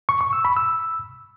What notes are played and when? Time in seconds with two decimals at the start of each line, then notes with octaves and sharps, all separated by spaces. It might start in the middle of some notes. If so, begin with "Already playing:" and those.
0.09 C#6
0.21 C#6
0.33 E6
0.45 B5
0.57 E6